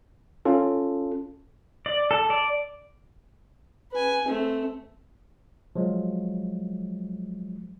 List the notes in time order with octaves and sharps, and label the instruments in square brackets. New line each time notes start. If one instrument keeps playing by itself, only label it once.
[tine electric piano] C#4 F4 A4
[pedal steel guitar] D5
A4
D5
[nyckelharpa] B4 G#5
A3 C4
[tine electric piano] F3 F#3 G#3